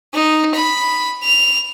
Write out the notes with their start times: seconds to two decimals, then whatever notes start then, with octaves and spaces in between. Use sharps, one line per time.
0.14 D#4
0.55 B5
1.24 F7